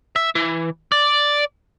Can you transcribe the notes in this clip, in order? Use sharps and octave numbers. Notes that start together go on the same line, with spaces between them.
E5
E3
D5